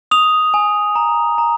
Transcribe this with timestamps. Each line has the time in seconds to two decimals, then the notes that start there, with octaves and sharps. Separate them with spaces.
0.11 D#6 F7
0.54 G#5
0.95 A#5
1.38 A#5